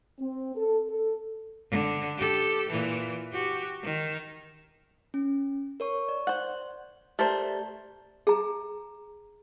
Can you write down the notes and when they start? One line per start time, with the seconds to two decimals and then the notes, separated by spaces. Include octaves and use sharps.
0.19 C4
0.55 A4
0.90 A4
1.71 D3
2.17 G4 A4
2.69 A#2 E3
3.32 F#4 G4
3.83 D#3
5.14 C#4
5.80 A#4 C#5 C#6
6.09 D5
6.27 C5 F#5
7.19 A3 G4 A#4 C5 D5
8.27 G#4 A#5